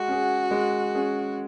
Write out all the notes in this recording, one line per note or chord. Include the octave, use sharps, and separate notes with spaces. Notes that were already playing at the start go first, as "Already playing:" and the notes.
Already playing: G#3 F#4
C#4 G#4
G#3
C#4 G#4